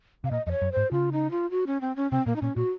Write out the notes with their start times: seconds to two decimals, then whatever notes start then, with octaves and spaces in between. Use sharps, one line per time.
0.24 C3 F5
0.31 A#2 D#5
0.46 F2 D#5
0.51 C#5
0.62 F#2
0.72 G#2 C5
0.92 C#3 F4
1.12 D#4
1.31 F4
1.51 F#4
1.67 C#4
1.81 C4
1.96 C#4
2.11 C3 C4
2.26 A#2 A#3
2.36 D#4
2.42 A#2 C#4
2.56 A#2 F#4